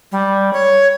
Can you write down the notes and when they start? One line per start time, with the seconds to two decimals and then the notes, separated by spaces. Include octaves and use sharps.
0.12 G3
0.53 C#5